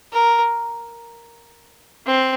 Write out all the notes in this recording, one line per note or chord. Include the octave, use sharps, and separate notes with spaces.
A#4
C4